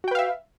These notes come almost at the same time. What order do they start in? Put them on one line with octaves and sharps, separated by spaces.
F#4 G5 B4 F5 E5